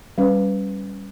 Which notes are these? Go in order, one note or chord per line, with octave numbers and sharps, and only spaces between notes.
G3 C#4 B4